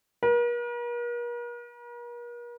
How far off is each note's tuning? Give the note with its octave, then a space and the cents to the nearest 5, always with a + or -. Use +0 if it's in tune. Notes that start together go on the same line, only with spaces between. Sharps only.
A#4 +45